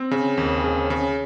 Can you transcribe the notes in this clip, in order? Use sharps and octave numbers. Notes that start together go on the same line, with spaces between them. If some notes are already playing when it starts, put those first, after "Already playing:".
Already playing: C4
C#3
D#2
C#3
C#3